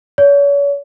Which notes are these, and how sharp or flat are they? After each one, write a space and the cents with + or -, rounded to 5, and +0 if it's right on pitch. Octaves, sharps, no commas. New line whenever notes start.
C#5 +40